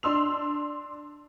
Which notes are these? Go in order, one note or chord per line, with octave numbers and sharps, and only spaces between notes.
D4 C6 E6 F7